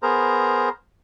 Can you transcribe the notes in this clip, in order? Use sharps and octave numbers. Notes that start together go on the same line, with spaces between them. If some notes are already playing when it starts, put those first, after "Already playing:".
B3 G#4 A#4 C5 A#5